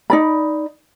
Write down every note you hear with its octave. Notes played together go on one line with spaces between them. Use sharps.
D#4 D5 B5